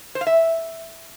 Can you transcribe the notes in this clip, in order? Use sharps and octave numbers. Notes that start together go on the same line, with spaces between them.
C5
F5
E5